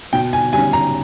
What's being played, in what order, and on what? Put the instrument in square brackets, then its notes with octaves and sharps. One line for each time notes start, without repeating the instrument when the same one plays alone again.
[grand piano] B2 G5
G#5
G3 C#4 G#5
A#5